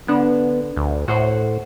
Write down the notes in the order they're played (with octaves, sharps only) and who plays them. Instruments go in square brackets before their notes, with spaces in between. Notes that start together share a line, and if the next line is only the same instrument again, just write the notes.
[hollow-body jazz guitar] D3 D4 [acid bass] B3
[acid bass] D2
[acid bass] A2 [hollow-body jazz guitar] F#4 C5